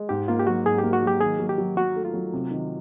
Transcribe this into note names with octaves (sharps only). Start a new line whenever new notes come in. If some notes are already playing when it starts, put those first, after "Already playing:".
Already playing: G#3
G#2 G4
A#3 F4
G4
F#3 F#4
G#2 G#4
A#3 G4
F#4
F#3 G4
D#3 G#4
F#3
G4
F#3
F#3 F#4
A3
F4
F#3
C3
D#3